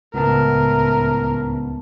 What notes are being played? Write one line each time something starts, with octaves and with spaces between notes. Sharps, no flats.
C#2 A2 B3 A#4 A5